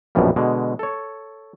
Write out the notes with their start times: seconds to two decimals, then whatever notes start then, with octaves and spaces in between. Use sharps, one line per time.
0.15 A#1 F#2 B2 E3 F3 G3
0.36 B2 D3 G#3
0.79 A4 C#5